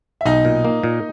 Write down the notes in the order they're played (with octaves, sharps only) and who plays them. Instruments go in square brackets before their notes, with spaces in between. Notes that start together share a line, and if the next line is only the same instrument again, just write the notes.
[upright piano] E5
[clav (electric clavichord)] B1 [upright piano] D#4 D#5
[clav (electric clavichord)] A#2
A#3
A#2